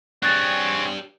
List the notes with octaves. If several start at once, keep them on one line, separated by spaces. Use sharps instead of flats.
C4 D4 G4 G#4 C#5 F#6 A6